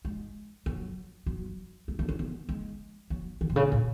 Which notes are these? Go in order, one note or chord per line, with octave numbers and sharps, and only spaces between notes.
G#3
F#3
F#3
G#3
A3
C#4
B3
G#3
F#3
D#3
B2
C#3
A2